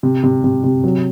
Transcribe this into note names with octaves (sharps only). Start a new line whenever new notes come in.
C3
C3
C3
C3
F#3